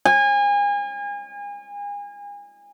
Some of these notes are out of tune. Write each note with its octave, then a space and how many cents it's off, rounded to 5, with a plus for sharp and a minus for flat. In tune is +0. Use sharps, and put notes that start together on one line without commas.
G#5 -35